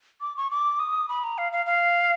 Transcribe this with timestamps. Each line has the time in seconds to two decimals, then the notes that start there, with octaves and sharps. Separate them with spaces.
0.21 D6
0.37 C#6
0.51 D6
0.79 D#6
1.09 B5
1.24 A#5
1.38 F5
1.52 F5
1.66 F5